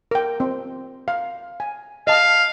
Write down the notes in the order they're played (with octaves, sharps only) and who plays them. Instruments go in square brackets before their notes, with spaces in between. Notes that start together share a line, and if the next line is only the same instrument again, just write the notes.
[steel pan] A#4 G5
C4
F5
G#5
[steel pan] D#5 A5 [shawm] F5